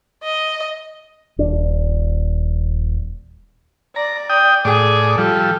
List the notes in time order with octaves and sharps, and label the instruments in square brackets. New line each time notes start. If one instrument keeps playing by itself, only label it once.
[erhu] D#5
[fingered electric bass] D#1 D4
[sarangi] D5 [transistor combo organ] A#5
[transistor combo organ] G5 D#6
[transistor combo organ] A2 D5 [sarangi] G#4
[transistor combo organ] F3 G3 [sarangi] A4